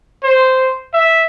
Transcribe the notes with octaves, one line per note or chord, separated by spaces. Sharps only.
C5
E5